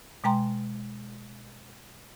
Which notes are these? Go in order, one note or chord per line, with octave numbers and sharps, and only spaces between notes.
B2 G#3 G5 A#5 C6